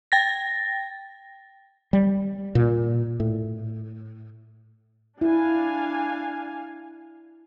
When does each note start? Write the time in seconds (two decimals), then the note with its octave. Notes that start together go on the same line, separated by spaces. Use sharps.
0.12 G5 A6 A#6
1.93 G3
2.55 A#2
3.20 A2
5.21 D4 E4 F5 G#5